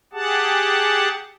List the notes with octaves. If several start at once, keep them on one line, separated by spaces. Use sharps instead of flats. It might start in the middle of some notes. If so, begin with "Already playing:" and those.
G4 G#4 F#5 A5